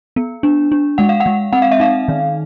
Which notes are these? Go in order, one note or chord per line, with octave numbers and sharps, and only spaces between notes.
B3
D4
D4
G#3 F#5
F5
F#5
G#3
C4 F#5
F5
E5
D#4 F5
D#3